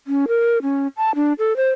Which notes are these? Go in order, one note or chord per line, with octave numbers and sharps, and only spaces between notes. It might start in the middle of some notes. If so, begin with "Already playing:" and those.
C#4
A#4
C#4
A5
D4
A4
C5